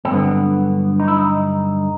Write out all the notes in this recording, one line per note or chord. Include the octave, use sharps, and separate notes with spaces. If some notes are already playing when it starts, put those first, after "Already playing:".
C4
G2 D3 F#3 B3
D#4
E4
D#4